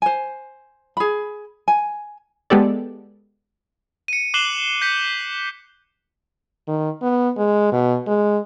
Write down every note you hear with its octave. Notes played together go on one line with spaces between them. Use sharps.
C5 G#5
G#4 B5
G#5
G#3 B3 G4 A4 D5
C#7 D#7
D6 F#6 C7 E7 F#7 G7
G6 B6 C#7
D#3
B3
G#3
B2
G#3